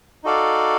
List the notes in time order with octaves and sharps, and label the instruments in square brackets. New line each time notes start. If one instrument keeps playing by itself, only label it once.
[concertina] D#4 F#4 A4 D5 F5